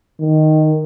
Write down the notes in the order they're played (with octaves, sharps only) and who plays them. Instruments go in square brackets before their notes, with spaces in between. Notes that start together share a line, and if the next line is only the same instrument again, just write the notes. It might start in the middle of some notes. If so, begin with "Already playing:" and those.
[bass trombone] D#3